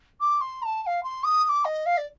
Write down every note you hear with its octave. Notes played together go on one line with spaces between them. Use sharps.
D6
C6
A#5
A5
A5
F5
C6
D#6
D#6
D6
D#5
F5
D5